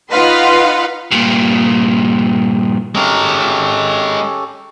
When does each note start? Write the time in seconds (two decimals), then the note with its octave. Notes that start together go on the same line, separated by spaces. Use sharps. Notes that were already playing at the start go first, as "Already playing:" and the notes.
0.12 D#4 F4 B4 F5 F#5 C6
1.11 G2 A#2
2.95 G#3 C#4 G4 A4 A#4